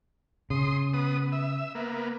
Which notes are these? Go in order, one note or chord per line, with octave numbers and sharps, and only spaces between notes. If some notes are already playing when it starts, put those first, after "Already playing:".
C#3 C6 D#6
B3 D#6
E5
A#3 B3